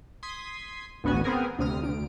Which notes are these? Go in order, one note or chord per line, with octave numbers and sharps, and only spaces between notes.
C6 D#6 G#6 B6
A1 D2 B3 F#4 G#5
B3 C4 G#4 A#4 G#5
D2 C3 D#6 F6
D2 D7